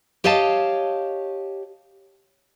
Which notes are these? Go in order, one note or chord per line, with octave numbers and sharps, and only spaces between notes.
G4 C#5 D#5 F5 A5